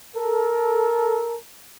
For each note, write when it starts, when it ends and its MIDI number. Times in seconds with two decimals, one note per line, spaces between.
0.15 1.35 69
0.15 1.35 70